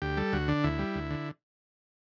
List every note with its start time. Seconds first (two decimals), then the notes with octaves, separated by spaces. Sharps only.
0.02 D2 G4
0.17 G3 A4
0.33 D2 F#4
0.48 D3 D4
0.64 D2 E4
0.79 G3
0.95 D2
1.11 D3